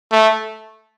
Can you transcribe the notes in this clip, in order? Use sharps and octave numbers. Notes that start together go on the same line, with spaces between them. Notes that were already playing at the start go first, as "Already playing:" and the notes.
A3